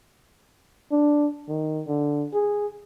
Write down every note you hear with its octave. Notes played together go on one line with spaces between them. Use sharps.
D4
D#3
D3
G#4